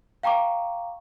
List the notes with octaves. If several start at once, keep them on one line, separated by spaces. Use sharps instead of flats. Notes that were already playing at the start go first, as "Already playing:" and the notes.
F5 G5 A#5 C#6 D6